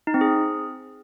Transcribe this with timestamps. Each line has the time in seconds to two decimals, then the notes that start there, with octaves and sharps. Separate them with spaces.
0.07 D#4
0.14 C4
0.21 G#4